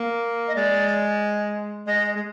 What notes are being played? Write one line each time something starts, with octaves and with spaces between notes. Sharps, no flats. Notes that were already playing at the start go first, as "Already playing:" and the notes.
Already playing: A#3
D#5
G#3 D5
G#3 D#5
G#3